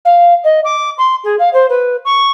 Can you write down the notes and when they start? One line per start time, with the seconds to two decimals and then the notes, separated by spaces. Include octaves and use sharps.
0.05 F5
0.44 D#5
0.64 D6
0.98 C6
1.24 G#4
1.39 F5
1.53 C5
1.69 B4
2.05 C#6